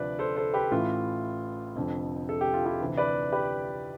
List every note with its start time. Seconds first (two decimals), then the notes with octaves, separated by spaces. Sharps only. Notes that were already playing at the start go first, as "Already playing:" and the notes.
Already playing: D2 C3 F3 B4 D5
0.19 A4 C5
0.36 A4 C5
0.54 G4 B4
0.71 A1 A2 E3 F4
1.76 F1 F2 D3 F3
2.29 A4
2.41 G4
2.54 F4
2.65 E4 G4
2.80 D2 C3 E3
2.97 B4 D5
3.32 G4 B4